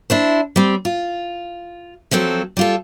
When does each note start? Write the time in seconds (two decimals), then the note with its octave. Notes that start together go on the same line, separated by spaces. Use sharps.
0.10 D4 E4 C5
0.56 G3 C4
0.85 F4
2.11 F3 F#3 C4 A4
2.57 G3 F4 A4